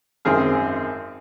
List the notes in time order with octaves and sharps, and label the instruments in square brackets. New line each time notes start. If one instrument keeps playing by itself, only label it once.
[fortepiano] G#1 F#2 D#3 C4 G#4 F6